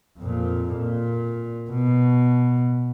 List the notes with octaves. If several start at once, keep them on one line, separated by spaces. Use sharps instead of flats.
F2 A#2
A#2
B2